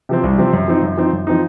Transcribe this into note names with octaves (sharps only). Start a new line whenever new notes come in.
C3 F3 C4
C2
C3 F3 C4
F#2
F3 C4 D#4
F#2
F3 C4 D#4
F#2
F3 C4 D#4